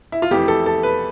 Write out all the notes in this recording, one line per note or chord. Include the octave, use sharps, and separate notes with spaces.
E4
F4
F2 E3 A3 E4 G4
A4
A4
B4